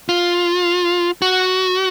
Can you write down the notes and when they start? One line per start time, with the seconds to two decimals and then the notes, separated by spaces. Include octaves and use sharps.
0.09 F4
1.22 F#4